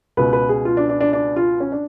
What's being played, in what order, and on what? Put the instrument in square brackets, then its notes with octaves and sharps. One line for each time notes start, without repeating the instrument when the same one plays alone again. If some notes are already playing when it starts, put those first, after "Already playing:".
[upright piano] C#2 B2 B4
B4
G#4
F4
D4
D4
D4
D4
F4
C#4
D4